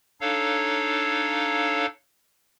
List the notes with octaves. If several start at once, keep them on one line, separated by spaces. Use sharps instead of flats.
D4 D#4 A4 C#5 F5